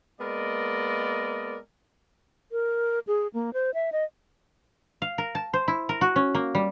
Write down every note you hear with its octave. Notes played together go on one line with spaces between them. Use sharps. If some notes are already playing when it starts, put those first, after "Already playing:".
G#3 A#3 B3 A#4 D5 D#5
A#4
G#4
A#3
C5
E5
D#5
F5
A#4
A5
C5
E4
A#4
F#4
C#4
A#3
G3